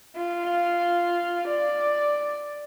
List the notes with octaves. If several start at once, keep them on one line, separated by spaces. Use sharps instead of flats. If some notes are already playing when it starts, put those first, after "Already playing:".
F4
D5